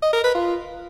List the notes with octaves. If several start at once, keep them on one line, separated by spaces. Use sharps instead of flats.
D#5
A#4
B4
F4